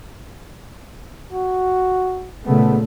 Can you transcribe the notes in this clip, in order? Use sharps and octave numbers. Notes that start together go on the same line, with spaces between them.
F#4
A#2 C#3 A3 B3